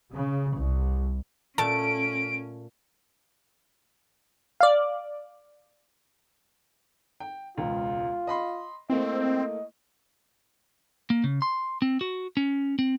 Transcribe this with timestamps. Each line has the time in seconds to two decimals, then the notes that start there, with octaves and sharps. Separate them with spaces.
0.13 C#3
0.56 C2
1.58 A#2 A3 C#4 A5 D7
4.60 D5 F5
7.20 G5
7.58 E1 C#2 F4
8.27 D#5 B5 C6
8.90 A3 A#3 C4 E4 D#5
11.10 A#3
11.24 C#3
11.42 C6
11.82 C4
12.01 F#4
12.37 C#4
12.79 C4